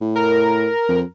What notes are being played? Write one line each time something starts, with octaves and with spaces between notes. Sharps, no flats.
A2
A#4
F2